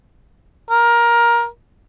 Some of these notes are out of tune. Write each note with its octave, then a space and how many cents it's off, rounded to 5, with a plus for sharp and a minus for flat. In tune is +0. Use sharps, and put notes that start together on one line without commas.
A#4 +15